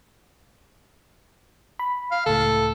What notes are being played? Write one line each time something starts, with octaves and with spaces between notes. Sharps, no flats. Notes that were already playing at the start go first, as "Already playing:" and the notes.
B5
F5
C#2 A2 A4